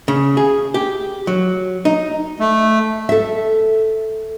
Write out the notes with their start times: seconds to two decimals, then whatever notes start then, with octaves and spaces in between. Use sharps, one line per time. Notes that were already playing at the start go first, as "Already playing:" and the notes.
0.08 C#3
0.37 G#4
0.74 G4
1.27 F#3
1.85 D#4
2.40 A3
3.09 A4 E5